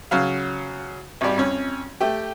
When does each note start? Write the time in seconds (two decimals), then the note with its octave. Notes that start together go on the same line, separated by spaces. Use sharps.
0.11 C#3 F#3 F5
1.21 G#1 G3
1.37 F2 C#4
2.01 A3 G4